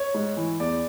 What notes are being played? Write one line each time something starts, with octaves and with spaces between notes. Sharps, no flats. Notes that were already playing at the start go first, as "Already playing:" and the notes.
Already playing: C#5
G#2
E3
E2 D5